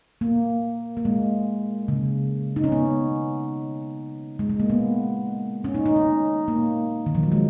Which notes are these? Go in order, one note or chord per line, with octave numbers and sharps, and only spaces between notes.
A#3
A#3
G#3
C#3
D#4
C#4
B3
G#3
G#3
A#3
B3
C#4
D#4
D#4
C#4
A#3
D#3
F3
F#3
G#3